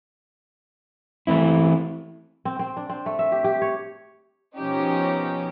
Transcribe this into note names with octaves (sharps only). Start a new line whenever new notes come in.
E3 A3 C4 E4
C4
C4
D4
C4
A3
E5
G4
G4
C#5
B2 F3 C#4 D#4 G4